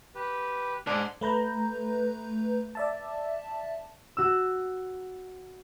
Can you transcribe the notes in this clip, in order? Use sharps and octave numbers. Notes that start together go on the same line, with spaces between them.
G4 B4
G#2 D4 F#5 G#5 C6
A3 B4 A#5 G6
D5 E5 A5
F#4 E6